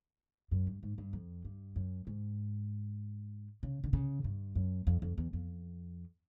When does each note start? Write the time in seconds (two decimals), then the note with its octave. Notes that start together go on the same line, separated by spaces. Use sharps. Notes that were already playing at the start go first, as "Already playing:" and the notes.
0.51 F#2
0.67 G2
0.83 G#2
0.98 G2
1.13 F2
1.45 G2
1.76 F#2
2.07 G#2
3.63 C#3
3.84 D3
3.93 C#3
4.24 G2
4.55 F#2
4.87 F2
5.02 F2
5.18 E2
5.33 F2